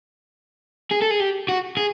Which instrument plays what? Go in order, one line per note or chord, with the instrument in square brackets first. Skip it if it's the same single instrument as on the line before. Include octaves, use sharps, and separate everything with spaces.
[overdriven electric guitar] G#4
A4
G#4
G4
F#4
G#4